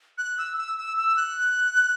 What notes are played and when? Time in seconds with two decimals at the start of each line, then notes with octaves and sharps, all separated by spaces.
0.18 F#6
0.38 E6
0.58 E6
0.78 E6
0.97 E6
1.17 F#6